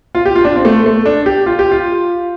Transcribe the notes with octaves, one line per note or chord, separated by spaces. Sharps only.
F4
G4
F4
D4
C4
A3
A3
D4
G4
F4
G4
F4